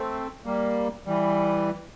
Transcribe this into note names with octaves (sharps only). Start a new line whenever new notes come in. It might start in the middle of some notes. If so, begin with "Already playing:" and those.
Already playing: A3 C4
G3 A#3
E3 G3